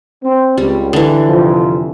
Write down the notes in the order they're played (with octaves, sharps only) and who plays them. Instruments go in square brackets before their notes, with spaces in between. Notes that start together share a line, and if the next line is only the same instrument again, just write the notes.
[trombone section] C4
[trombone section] C#2 [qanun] G3
[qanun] D3 E3
[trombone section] F2 C3 F3